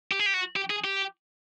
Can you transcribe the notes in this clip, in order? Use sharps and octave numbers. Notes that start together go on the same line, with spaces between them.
G4
G#4
G4
F#4
G4
G#4
G4